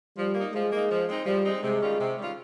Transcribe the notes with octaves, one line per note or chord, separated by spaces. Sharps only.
F3 G3
A#3 D#4
F3 G#3
A#3 D#4
F3
G#3 C4 D#4
F3 G3
G#3 C4 D#4
C3 G#3
D#3 G3 C#4 F4
C3
D#3 G3 C#4 F4